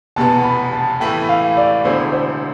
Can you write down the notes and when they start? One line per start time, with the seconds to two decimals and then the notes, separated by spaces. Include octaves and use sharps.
0.16 F1 E2 B2 B3 A5
0.44 B5
0.73 A5
1.00 A2 E3 A3 E4 G5
1.29 F5
1.57 D5
1.85 E1 E2 D3 A3 E4 C5
2.13 C5